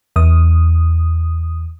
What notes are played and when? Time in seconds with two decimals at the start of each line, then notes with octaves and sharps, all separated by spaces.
0.16 E2 D#6